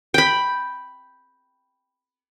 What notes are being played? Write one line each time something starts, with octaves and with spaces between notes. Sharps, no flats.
G5 B5